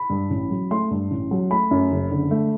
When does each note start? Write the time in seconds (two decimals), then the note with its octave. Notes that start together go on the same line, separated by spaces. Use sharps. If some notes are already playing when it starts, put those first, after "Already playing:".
Already playing: B5
0.10 G2
0.30 A1
0.50 F#3
0.71 A3 C6
0.91 G2
1.11 A1
1.31 F#3
1.51 A3 B5
1.71 F#2
1.91 F#1
2.11 D3
2.31 A3